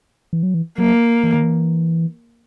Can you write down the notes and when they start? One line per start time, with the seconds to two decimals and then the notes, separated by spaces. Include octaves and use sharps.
0.33 E3
0.43 F#3
0.54 E3
0.78 F#3 A#3
1.24 E3
1.34 D#3
1.43 E3